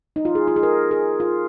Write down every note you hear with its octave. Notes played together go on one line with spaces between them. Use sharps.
D#4
F4
G#4
F4
G#4
A#4
G#4
F4